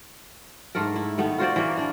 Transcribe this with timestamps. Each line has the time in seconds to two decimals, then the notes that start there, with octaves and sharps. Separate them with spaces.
0.75 G#2 A3 A4 A#4
0.96 E4
1.18 D#3 A3 B3
1.38 F4 F#4 C5 D5
1.56 E3 A#3
1.77 A#3 D4